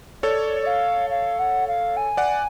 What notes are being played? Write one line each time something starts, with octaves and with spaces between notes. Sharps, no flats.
A4 C#5 D5
D5
F5
F5
F#5
F5
G#5
D5 F#5